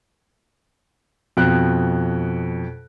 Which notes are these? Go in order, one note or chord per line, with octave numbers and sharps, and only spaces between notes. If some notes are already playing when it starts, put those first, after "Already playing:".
F2 B2 F#6